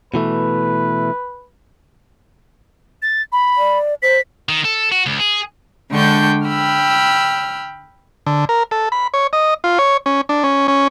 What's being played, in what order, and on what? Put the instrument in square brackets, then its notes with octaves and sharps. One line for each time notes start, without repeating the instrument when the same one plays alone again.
[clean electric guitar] B2 E3 A3 [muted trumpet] B4
[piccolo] A6
B5
[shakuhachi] D5
[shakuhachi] C5 [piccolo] B6
[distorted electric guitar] D#3
A4
F#4
C#2
G#4
[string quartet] D3 G#3 D4 G5 C#6 G6
G5 B5 E6 F6
[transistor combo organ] D3
A#4
A4
B5
C#5
D#5
F4
C#5
C#4
D4
C#4
C#4